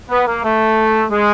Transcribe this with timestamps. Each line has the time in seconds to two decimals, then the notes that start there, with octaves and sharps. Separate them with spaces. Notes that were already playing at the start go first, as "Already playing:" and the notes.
0.09 B3
0.25 A#3
0.43 A3
1.10 G#3